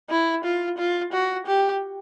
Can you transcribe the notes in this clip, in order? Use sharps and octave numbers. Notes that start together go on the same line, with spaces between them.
E4
F4
F4
F#4
G4